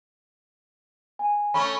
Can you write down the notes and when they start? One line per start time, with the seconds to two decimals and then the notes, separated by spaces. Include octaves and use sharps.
1.19 G#5
1.54 A3 C#4 B5 C#6